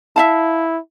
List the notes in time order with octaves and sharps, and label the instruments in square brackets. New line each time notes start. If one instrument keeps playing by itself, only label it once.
[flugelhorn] E4 [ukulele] E5 F5 A5